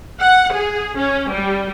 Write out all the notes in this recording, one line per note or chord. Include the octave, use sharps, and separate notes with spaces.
F#5
G#4
C#4
G3